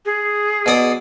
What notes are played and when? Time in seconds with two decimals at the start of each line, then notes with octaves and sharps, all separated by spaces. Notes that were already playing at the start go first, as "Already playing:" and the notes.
0.05 G#4
0.66 B2 D5 D#6